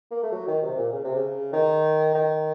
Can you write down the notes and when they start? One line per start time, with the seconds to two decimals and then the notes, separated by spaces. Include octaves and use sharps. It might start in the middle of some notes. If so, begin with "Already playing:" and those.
0.11 A#3
0.23 A3
0.32 F#3
0.48 D#3
0.63 C3
0.77 A#2
0.93 C#3
1.04 C3
1.16 C#3
1.53 D#3
2.14 D#3